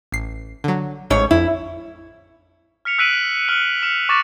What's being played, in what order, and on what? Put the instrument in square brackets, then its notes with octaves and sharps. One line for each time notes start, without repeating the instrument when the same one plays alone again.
[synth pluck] A1 C7
D3 F#3
[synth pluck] A1 [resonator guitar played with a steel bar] G#2 C#5
[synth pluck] F2 [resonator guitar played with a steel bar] E4
[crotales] F6 B6 C#7 F7
E6 F#6 B6 D7 D#7 F#7
F6 C#7 F#7
F6 C#7 E7 F7
C#6 D6 A6 A#6 E7